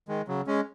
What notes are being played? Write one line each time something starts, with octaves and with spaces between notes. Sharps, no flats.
D#3 G#3
C#3 F#3
G#3 C#4